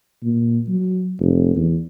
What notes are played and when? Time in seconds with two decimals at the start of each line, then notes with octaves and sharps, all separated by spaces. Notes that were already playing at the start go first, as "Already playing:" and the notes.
0.23 A#2
0.68 F#3
1.19 F1
1.56 E2